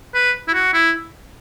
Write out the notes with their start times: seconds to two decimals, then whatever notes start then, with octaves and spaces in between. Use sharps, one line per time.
0.14 B4
0.48 E4
0.53 F#4
0.73 E4